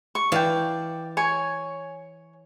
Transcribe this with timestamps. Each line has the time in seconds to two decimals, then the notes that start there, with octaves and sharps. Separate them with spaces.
0.15 C#6
0.32 E3 D5 F5 G5 A5
1.17 C#5 G#5